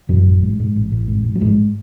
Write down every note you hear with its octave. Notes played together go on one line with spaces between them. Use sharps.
A1 F#2 F#3
A1
G#2
G#2
A1
A1
G#2
G#2
F#3
A1 G#2 G#3